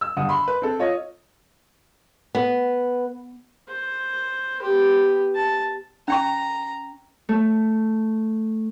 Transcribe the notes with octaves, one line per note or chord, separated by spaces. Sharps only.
E6
G1 F#5 D#6
B5 C6
B4
C4 A4
F4 C#5 D#5
B3
C5
B3 G4
A5
C#4 G5 A#5 C#6
A3